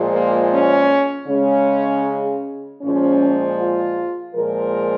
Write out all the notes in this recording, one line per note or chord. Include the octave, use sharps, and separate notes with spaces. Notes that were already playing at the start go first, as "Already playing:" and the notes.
Already playing: A#2 F3 G#3
A#3
C#4
C#3 G#3 C#4
A#2 F3 G#3 C#4
F4
A#2 F3 G#3 A#4